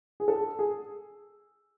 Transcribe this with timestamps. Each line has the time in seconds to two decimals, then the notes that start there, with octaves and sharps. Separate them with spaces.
0.20 G#4
0.28 A4
0.59 G#4